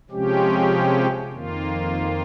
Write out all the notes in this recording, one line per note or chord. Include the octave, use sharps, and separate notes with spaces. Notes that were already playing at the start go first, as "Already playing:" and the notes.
C3 F3 G#3 C#4 G4
F2 D#3 A#3 F4